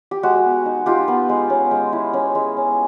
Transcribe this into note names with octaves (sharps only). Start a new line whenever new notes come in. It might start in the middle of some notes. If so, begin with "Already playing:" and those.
G4
G#3 F#4
B3
D#4
D#4 F4 G4
B3
G#3
C#4
G#3
E4
C#4
G#3
C#4